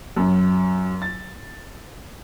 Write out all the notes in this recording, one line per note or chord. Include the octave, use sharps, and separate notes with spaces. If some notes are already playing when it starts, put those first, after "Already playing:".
F#2
A6